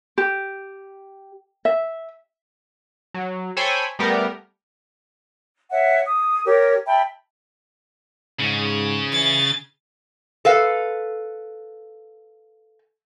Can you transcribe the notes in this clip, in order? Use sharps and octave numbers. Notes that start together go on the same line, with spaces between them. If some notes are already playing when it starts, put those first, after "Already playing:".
G4
E5
F#3
A4 C5 C#5 G5 G#5 B5
G3 A3 B3 G4 A#4
C#5 E5 F#5
D#6
G4 A#4 C#5
E5 G5 A5 B5
G#2 C#3
E3 A6
A4 B4 F5